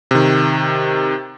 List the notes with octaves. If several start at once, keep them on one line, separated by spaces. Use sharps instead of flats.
C3 D#3